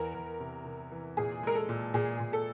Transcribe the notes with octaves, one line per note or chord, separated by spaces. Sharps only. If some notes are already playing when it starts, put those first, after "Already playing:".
Already playing: E2 E3 A#4
E2
C3
C3
E3
A#2 G#4
G#3 A#4
A4
A#2
A#2 G#4
A#2
A4